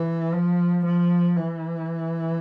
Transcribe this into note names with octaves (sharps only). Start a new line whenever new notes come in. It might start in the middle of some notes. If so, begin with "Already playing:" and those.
Already playing: E3
F3
F3
E3